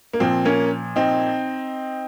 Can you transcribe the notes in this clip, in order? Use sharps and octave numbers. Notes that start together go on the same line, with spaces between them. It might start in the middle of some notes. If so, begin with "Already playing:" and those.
A#3
A#2 F3 C4
A#3 C#4
C4 D#4